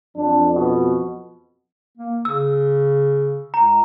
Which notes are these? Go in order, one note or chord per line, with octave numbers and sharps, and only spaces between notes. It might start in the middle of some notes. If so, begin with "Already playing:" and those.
F2 D4
B2
A#3
C#3 E6
C#2 A#5